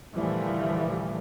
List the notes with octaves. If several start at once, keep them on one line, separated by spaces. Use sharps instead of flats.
A#2 D3 E3 F3 G3 A3